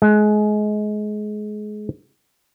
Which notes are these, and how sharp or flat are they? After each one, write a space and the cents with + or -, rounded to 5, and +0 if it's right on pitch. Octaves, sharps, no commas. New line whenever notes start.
G#3 +25